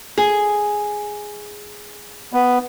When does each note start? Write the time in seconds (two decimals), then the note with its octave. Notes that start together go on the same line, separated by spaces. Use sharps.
0.18 G#4
2.33 B3